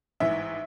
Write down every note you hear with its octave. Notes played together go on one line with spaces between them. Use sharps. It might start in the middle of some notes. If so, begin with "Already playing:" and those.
A1 G#2 E3 E5